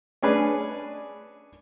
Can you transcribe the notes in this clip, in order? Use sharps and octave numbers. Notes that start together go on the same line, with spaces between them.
C#4 D4 G#4 B4